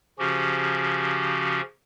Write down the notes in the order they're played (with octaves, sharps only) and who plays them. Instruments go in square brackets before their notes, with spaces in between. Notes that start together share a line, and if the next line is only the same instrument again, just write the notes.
[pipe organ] C#3 F3 C#4 F#4 G4